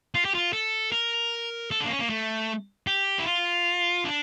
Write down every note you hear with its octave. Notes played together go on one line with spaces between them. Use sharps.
F4
G4
F4
A4
A#4
A4
D4
A#3
C#4
A#3
A3
G4
E4
F4
D4